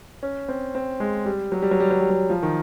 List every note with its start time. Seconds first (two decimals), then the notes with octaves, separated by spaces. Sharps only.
0.23 C#4
0.49 C4
0.75 C4
1.00 G#3
1.26 G3
1.52 F#3
1.62 G3
1.71 F#3
1.80 G3
1.91 F#3
2.01 G3
2.10 F#3
2.30 F3
2.43 D#3